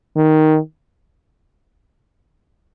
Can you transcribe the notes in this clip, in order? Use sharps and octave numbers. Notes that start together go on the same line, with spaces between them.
D#3